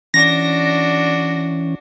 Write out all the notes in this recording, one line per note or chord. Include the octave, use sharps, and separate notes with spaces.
E3 C#4 D4 F#4 A#6